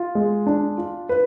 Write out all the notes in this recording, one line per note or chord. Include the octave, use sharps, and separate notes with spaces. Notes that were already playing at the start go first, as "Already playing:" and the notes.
Already playing: F4
G#3
D4
F4
B4